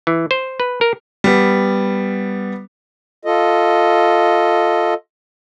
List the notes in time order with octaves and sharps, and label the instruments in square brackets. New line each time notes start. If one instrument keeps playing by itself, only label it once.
[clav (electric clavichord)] E3
C5
B4
A#4
[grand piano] G3 B3
[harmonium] F4 A4 D#5